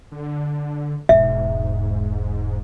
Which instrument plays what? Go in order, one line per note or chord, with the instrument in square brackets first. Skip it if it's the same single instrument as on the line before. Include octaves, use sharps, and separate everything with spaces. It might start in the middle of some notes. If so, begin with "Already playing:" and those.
[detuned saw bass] D3
[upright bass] E1 E2 [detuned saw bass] G#2 [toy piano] E5